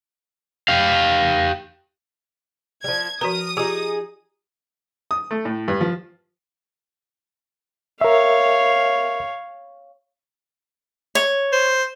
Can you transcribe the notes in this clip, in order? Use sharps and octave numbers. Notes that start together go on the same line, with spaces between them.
G4 F5
F3 G3 G#6
F3 F#4 A#4 B4 D#6
D#4 F4 G4 G#4
D#6
A3
A2
G2
F3
A#4 C#5 E5 F5
C#5
C5